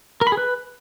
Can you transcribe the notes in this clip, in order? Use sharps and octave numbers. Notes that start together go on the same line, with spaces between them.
A#4
B5
G#4
B4